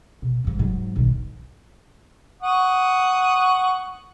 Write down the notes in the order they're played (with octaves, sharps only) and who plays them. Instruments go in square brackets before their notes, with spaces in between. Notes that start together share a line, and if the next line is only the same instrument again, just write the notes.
[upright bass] B2
F2 G#2
G#2 F#3
B1 D#3
[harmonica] F#5 C#6 D#6